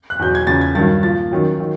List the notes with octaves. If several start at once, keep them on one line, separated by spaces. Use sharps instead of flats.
F#6
E2 B2 F#3 G6
G#6
E2 C#3 F3 A6
G#6
G2 D#3 F#3 A6
A#2 F3 A6
F#2 D#3 F#3
D#3 F#3